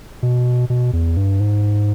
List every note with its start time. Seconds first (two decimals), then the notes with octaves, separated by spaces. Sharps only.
0.23 B2
0.70 B2
0.93 E2
1.17 G2
1.40 G#2